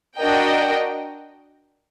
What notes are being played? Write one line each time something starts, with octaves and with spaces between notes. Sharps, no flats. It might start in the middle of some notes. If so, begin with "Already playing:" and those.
D4 F#4 A#4 D#5 G5